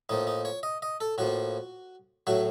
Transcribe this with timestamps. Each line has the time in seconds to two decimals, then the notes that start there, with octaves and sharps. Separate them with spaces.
0.09 A2 F3 A#3 D#4
0.27 D#4
0.45 C#5
0.63 D#5
0.82 D#5
1.01 A4
1.18 A2 F3 A#3 F#4
2.27 A2 F#3 A3 F#4